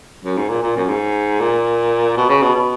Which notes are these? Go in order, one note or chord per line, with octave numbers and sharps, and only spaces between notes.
F#2
G#2
A#2
A#2
F#2
G#2
A#2
B2
C#3
B2
B2